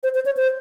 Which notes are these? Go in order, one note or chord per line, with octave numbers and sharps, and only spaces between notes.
C5
C5
C#5
C5